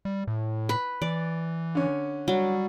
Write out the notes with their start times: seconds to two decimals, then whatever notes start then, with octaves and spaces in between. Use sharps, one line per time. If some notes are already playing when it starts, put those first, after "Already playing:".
0.05 G3
0.27 A2
0.69 B4
1.02 E3 D5
1.75 D3 C#4
2.28 F#3 G3